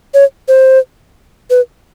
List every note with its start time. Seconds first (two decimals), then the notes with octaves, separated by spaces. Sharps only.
0.14 C#5
0.48 C5
1.50 B4